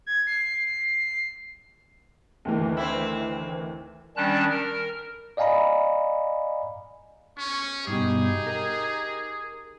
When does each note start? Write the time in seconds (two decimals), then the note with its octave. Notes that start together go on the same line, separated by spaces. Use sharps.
0.06 G#6
0.27 C7
2.45 D2 D#3 E3
2.77 C4 E4
4.17 D#3 G3 C#4 D4 A5 F#6
4.51 A#4 F6
5.37 D5 D#5 F5 G#5 A#5 B5
7.39 C#4 C#6
7.87 G2 B2 D#4 G4 G#4
8.47 A#4